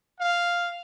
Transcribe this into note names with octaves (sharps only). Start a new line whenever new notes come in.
F5